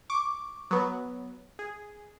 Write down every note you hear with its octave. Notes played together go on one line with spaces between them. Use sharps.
C#6 D6
F#3 B3
G#4